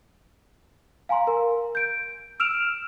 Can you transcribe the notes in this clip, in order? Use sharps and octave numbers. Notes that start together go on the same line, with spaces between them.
F5 G#5 A#5 C6
A#4
G6 D7
E6 F6 D7 E7 F7